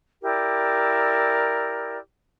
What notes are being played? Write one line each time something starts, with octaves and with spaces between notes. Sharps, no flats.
E4 G4 A#4 D5